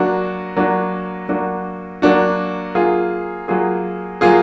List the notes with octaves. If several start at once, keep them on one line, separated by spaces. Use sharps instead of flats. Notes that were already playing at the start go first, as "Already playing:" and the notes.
Already playing: F#3 A#3 D4 F#4
F#3 A#3 D4 F#4
F#3 A#3 D4 F#4
F#3 A#3 D4 F#4
F#3 A#3 F4 G#4
F#3 A#3 F4 G#4
F#3 A#3 F4 G#4